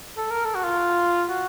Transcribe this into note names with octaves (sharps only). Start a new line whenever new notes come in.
A4
A#4
A4
F#4
F4
F#4